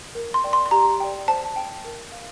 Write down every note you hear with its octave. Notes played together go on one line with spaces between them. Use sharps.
A#4
C6
D5 G5
C6
C6
G4 A#5
D5 G5
C5 A5
G5
A#4
F5